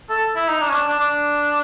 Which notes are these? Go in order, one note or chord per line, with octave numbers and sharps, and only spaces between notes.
A4
E4
D#4
D4
C#4
D4
D4
D4